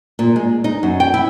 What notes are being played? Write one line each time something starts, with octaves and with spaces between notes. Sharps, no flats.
A#2
G#3
D#4
F#2
G5
E4